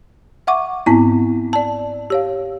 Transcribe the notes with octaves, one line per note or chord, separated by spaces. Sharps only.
E5 F#5 C#6 D6
G#2 B3 C4 E4
D5 A5
G4 C#5 F5